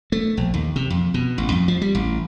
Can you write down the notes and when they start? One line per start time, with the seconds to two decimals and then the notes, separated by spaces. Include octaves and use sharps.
0.12 A3
0.37 A#1
0.54 D#2
0.76 C3
0.90 F2
1.14 B2
1.38 A1
1.52 F2
1.68 F3
1.82 G3
1.95 A1